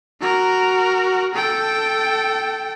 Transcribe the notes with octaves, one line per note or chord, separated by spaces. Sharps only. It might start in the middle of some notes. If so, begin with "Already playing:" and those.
F#4 A#4
A4 G5